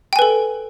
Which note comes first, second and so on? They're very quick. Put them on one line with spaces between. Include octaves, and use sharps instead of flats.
G5 G#5 B4 A4